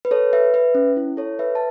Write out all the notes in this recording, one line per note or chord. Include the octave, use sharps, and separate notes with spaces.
B4
A4 C#5
B4 E5
B4 E5
C#4
E4
A4 C#5
B4 E5
A5